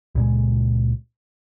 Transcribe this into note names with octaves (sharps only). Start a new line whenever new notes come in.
C#2 A#2 G#3